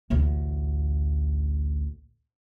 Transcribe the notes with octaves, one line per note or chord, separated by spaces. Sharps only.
A1 D2